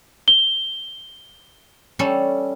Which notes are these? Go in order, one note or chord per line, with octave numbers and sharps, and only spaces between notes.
G7
G3 C#4 A4